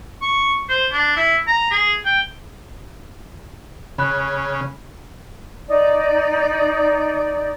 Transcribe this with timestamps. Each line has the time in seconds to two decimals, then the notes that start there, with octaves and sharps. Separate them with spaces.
0.22 C#6
0.69 C5
0.92 D4
1.16 E4
1.48 A#5
1.71 G#4
2.05 G5
3.98 C#3 B5 F#6
5.68 D#4 D5